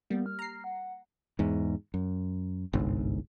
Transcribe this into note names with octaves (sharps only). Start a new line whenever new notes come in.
G3 A#3 B3
F6
A#5 C7
F#5
E2 G#2
F#2
G1 C2 G#2